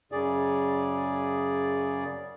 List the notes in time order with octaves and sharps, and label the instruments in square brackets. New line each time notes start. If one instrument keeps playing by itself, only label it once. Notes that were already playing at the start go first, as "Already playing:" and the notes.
[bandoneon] F#2 C#3 G#4 D5